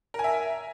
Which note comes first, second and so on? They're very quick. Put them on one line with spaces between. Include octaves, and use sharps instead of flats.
A#4 G#5 E5